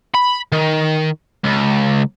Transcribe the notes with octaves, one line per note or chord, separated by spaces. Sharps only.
B5
D#3
C#2